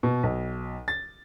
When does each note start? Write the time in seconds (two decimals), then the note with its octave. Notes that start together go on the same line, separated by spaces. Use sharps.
0.03 B2
0.23 B1
0.88 A6